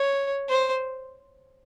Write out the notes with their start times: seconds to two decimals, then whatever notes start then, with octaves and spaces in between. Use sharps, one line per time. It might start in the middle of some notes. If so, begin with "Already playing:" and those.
Already playing: C#5
0.49 C5